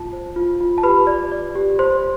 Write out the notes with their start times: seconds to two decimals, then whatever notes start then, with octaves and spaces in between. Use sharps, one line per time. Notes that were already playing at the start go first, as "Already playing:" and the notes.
Already playing: F4 A5
0.13 C5
0.36 F4
0.61 F4
0.78 A5
0.83 G4 B4 B5
1.07 D5
1.32 D5
1.55 G4
1.79 C5 C6